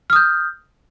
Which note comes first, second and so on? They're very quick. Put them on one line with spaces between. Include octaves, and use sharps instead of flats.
F6 D#6 G6